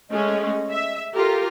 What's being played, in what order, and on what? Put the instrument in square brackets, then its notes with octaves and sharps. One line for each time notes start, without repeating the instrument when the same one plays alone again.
[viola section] G#3 A3 C#4 [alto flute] D#5
[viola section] E5
[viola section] F4 G4 A#4 [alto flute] A4